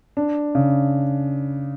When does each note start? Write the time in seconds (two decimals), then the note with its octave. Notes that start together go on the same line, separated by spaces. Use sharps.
0.17 D4
0.55 C#3